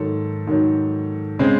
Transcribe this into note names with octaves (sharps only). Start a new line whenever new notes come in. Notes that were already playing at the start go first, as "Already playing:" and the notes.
Already playing: G#2 D#3 F#3 A4
G#2 D#3 F#3
C#3 G#3 C4